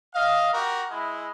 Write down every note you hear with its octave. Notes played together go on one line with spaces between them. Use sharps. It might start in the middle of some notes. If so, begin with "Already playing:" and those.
D#5 F5
F#4 G4 A#4
G#3 E4